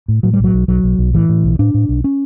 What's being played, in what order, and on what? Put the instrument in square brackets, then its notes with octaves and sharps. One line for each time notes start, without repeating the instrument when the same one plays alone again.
[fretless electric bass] A2
A2 F#3
G3
B1
F#3
B1
B1 F#3
B1
B1
A2 E3
A2
B1
A2 D4
A2
B1
C#4